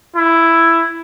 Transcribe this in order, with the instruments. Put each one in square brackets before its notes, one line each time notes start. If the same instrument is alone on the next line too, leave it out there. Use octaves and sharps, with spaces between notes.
[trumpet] E4